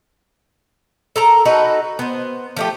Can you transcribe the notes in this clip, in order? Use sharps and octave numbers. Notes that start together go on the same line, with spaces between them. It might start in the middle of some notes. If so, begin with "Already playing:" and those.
A4 A#4 A#5
D#4 F#4 A4 B4
B3 C5
F3 A3 G4